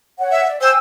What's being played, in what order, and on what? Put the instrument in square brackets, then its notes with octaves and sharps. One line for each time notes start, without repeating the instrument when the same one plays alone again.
[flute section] C#5 F#5
[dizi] E5
[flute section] D5
[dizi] C5 [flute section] G5 G#5 E6